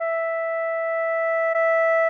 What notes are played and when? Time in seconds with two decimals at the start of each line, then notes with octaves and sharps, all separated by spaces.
0.01 E5
1.55 E5